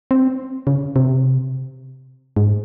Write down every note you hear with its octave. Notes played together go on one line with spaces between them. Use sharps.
C4
C#3
C3
G#2